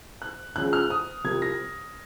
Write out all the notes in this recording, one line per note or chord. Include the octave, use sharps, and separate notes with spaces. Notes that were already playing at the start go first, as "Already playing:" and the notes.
F#6
C#2 C#3 F3 F#6
F6
D#6
C2 C3 F3 G#6
A#6